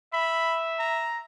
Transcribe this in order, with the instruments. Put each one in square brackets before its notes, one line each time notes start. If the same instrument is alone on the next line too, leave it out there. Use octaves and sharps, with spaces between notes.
[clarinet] E5 [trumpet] B5
[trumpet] A#5